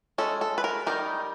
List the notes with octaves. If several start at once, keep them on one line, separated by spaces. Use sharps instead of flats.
G#3 C#4 A4
A4
B4
A#4
D#3 G3 A#3 D#4 A#4